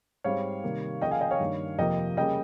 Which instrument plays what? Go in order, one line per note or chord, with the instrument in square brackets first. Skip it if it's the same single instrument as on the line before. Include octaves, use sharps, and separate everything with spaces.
[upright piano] G#2 G3 C4 C#5 F5
C3 D#3 G3 A#3
C#3 F3 A#3 D#5 G5
F5 G#5
D#5 G5
C#5 F5
G2 D#3 A#3
F2 C3 F3 A#3 D#5 G5
C#3 G3 A#3 D#5 G5